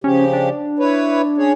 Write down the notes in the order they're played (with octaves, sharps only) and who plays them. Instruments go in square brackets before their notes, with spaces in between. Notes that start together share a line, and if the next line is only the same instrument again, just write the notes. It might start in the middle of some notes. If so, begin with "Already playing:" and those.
[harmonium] C#3 F3 G4 [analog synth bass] C#4
[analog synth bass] D4
[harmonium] E4 B4 C#5
C#4 G#4 C#5